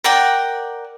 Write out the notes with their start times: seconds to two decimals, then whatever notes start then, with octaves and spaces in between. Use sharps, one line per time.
0.04 A#4 D5 F#5 G5